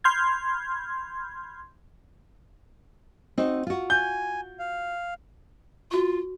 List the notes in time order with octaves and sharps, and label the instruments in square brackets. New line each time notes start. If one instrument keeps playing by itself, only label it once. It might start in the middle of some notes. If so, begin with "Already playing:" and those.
[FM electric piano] B5 C6 F6 G6 G#6
[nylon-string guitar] C4 D#4 F#4
F4 F#4
[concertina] G#5 [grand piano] G6
[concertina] F5
[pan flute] F4 [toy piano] F#4 C#6